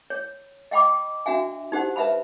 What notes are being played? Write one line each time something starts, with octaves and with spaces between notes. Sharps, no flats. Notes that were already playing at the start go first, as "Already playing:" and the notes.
C#5
D#5 F5 G5 B5 D6
D4 F#4 E5 F5 G#5
D#4 G4 C5 F#5
B4 E5 F5 A5 B5